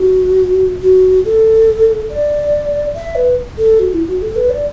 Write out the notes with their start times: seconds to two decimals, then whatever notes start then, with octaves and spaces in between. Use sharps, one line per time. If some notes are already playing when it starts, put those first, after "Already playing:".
Already playing: F#4
0.82 F#4
1.25 A4
2.10 D5
2.95 E5
3.15 B4
3.58 A4
3.79 F#4
3.93 E4
4.07 F#4
4.22 A4
4.36 B4
4.50 D5